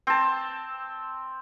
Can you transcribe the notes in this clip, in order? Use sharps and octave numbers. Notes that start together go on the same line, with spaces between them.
C4 A5